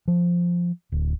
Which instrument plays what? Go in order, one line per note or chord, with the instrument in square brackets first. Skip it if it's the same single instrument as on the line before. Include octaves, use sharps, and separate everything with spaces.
[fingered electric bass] F3
D1